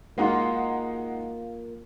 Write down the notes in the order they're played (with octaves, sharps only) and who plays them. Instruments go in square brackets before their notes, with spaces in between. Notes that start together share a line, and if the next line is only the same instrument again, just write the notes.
[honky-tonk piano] G#3 D#4 F#4 [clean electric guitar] A#3 F4